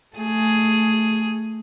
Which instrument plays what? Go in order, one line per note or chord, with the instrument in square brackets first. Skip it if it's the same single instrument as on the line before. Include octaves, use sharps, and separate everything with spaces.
[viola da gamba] A3 G#4